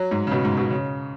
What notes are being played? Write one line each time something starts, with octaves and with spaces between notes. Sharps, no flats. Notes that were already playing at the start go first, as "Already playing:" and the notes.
Already playing: F#3
G#2
C#3
B2
G#2
B2
C#3